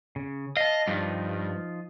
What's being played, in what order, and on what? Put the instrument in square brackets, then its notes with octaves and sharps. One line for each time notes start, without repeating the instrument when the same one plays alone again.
[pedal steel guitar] C#3
[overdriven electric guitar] D#5 [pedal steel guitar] F5 A5
[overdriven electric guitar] G2 [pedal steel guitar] F3 D#4 F4